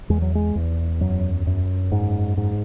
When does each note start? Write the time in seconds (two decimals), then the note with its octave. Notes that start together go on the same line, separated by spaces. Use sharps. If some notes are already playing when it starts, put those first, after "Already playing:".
0.09 E2 G#3
0.22 F#3
0.35 G#3
0.55 E2
1.01 F#2 F#3
1.47 F#2
1.92 G#2
2.37 G#2